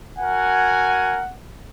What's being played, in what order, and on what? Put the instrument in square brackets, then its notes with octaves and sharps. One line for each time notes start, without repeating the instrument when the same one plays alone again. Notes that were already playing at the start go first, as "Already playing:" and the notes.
[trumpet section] F#4 A#4 G#5 [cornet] F#5